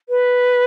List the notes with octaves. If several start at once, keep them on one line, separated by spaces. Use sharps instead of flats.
B4